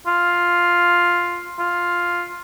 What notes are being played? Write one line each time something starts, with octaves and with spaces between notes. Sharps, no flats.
F4
F4